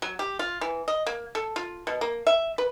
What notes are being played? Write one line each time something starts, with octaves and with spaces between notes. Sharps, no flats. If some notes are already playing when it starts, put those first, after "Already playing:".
F#3
G4
F4
E3
D#5
A#3
A4
F4
B2
A#3
E5
B4